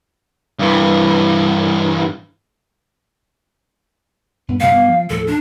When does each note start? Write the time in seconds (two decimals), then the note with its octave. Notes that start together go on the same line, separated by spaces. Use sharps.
0.59 G2 E3
4.48 G2 B3
4.60 F#2 C3 A3 F5
4.72 G2 B3
4.88 F3
5.10 D#2 A2 F3 A4
5.27 D4